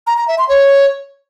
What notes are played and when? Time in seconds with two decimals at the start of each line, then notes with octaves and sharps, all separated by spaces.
0.07 A#5
0.17 A#5
0.28 E5
0.38 C6
0.49 C#5